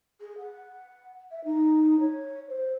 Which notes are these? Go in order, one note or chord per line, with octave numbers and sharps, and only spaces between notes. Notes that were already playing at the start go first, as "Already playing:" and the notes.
G#4
F#5
E5
D#4
C#5
C5